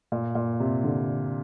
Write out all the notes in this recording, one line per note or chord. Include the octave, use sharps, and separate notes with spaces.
A#2
A#2
C3
D3